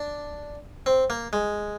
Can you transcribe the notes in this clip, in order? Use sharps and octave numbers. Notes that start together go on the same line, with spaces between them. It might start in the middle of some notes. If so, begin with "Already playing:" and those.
Already playing: D4
C4
A#3
G#3